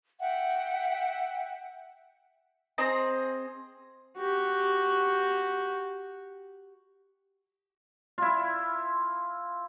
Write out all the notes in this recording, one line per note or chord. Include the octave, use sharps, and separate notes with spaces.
E5 F#5 G5
C4 G#4 D#5 A#5
F#4 G4
E4 F4